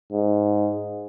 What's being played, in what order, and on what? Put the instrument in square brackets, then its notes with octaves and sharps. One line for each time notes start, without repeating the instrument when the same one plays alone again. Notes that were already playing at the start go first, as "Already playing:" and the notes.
[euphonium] G#2